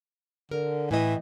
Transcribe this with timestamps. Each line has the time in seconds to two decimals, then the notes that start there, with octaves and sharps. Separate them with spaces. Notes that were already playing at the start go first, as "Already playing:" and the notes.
0.51 D3 A#4
0.91 A2 E3 D#5